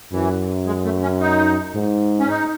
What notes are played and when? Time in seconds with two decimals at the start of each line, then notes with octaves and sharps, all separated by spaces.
0.13 F#2 E3
0.66 G#3
0.84 A3
1.02 C#4
1.20 D#4
1.74 G#2
2.19 C#4
2.28 D#4